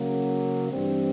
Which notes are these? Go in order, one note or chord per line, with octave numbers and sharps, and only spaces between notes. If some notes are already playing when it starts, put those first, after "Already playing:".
Already playing: C#3 F#3 A#3
G2 E3 G3 C4